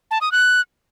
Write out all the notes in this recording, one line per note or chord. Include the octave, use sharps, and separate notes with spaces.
A5
D#6
F#6